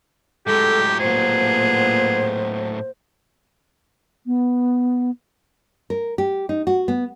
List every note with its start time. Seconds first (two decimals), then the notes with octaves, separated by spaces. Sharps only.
0.47 A2 F#3 G#3 G4 A4
1.00 A#2 B3 G#4 C5
4.26 B3
5.90 A#4
6.18 G4
6.49 D#4
6.67 F#4
6.88 B3